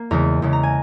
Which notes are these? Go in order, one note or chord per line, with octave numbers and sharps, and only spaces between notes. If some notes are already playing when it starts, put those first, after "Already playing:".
Already playing: A#3
E2 C#3 G#3 A#4
E2 C#3 G#3
A#5
G#5